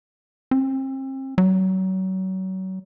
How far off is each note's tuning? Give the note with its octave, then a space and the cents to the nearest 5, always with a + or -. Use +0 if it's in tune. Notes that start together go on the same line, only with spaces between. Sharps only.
C4 +35
F#3 +30